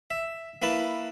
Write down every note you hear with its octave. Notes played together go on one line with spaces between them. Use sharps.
E5
A#3 E4 B4 A5